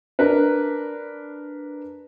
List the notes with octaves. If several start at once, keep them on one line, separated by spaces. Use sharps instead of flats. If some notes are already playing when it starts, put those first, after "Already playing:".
D4 A#4 B4